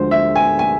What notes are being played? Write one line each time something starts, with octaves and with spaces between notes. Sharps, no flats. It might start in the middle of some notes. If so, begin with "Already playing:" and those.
Already playing: D2 D3 F3 G#3 C5
E5
G#5
G#5